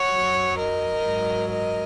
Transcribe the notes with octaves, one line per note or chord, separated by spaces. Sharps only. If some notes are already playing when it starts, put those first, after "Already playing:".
Already playing: C#5 F#5
F#2 F#3
A#4 D#5
G#2 F#3
A#4 D#5